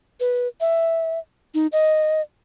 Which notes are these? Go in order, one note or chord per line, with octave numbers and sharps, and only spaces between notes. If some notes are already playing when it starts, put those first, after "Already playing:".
B4
E5
D#4
D#5